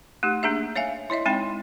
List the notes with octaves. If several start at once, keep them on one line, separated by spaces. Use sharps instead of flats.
A3 D#4 G4
A#3 D4 G#4 E5
C#5 E5 F5 G#5
E4 C#5 D#5 E5
G#3 C4 D#4 G5 B5